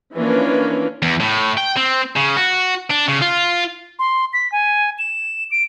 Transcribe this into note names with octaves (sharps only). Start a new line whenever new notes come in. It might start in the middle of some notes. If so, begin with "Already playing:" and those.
E3 F3 A#3 C#4 D4
E2
A2
G5
C4
C#3
F#4
D4
C#3
F4
C6
B6
G#5
E7
D7